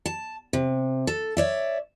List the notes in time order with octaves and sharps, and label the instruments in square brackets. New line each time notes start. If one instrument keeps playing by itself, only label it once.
[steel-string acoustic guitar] A5
C3
A4
C#5 D5 E5